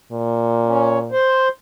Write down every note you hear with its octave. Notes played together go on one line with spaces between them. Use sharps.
A#2
C#4
C5